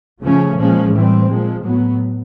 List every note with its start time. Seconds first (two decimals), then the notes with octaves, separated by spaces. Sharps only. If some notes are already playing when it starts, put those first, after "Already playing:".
0.22 C#3 F3 A3 C#4
0.57 A#2 F3 G#3 C#4
0.92 A2 E3 G3 C4
1.28 A#2 F3 G#3
1.63 A2 F#3 B3